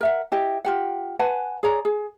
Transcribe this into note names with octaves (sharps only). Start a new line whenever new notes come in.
A#4 E5 F#5
E4 G4 D#5
F4 G4 F#5
B4 F#5 G#5 A5
G#4 C#5 D5 A#5
G#4